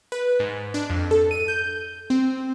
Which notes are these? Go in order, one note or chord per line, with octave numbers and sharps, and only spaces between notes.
B4
G#2
D4
F2
A4
D#7
G6
C4